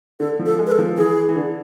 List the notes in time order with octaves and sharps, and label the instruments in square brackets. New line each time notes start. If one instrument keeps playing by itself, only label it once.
[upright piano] D3 [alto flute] A4
[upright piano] F3
[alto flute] A4
[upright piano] G#3
[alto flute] B4
A4
[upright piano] F3
[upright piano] E3 [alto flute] G#4
[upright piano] E3
D3